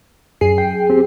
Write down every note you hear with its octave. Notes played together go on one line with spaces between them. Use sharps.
F#2 G#4 C7
G5
C4 G4